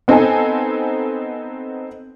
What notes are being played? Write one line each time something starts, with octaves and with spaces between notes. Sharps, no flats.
B3 C4 D#4 A4 G#5